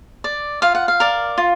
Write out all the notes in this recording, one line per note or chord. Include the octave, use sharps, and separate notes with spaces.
D5
F4 F5
F#5
F5
A#4 D5
F4